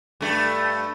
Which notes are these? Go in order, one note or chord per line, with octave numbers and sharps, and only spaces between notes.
G2 A3